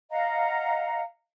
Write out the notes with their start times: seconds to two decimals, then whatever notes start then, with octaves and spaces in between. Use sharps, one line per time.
0.10 D#5 F5 F#5 A#5